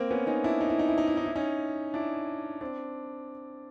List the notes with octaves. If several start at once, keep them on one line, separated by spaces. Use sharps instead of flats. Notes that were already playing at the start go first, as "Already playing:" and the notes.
Already playing: A#3 C4
B3 C#4
C#4 D#4
D4 E4
D#4
E4
D#4
E4
D#4
E4
D#4
E4
C#4 D#4
D4 E4
C4 D4